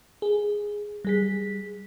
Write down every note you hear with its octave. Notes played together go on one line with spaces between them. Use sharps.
G#4
G3 G#4 B6